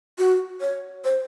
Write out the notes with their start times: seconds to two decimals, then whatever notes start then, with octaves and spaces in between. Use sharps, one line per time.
0.18 F#4
0.61 C#5
1.05 C5